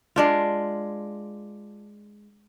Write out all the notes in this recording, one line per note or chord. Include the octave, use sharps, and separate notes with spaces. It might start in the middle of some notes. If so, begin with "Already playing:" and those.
G#3 D4 F4